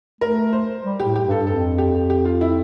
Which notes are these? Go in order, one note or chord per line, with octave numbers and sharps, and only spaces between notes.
A3 A#4
C5
G3
G4
A2
G4
G2
A4
F2 A4
G4
G4
F4
E4